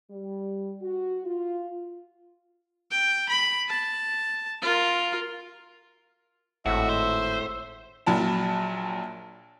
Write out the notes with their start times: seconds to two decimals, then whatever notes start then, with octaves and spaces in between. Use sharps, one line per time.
0.10 G3
0.81 F#4
1.25 F4
2.91 G5
3.29 B5
3.69 A5
4.62 F4 A#4
6.66 G#1 A2 F#4 E5
6.89 C5
8.06 A#1 A#2 F#3 A5 B5